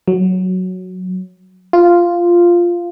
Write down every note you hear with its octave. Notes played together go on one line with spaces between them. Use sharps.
F#3
F4